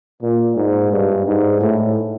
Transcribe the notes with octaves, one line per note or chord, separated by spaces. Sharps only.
A#2
G#2
G2
G#2
A2